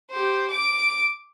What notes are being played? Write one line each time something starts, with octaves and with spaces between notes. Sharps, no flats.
G4 C5
D6 D7